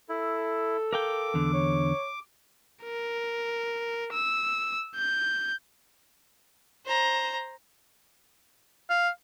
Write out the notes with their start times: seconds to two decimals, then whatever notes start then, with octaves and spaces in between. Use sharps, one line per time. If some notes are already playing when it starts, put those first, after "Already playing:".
0.09 E4 A4
0.93 A#4 F5 G5 D6
1.34 E2 D3
1.53 C#5
2.84 A#4
4.13 E6
4.96 G6
6.86 C5 A#5
8.90 F5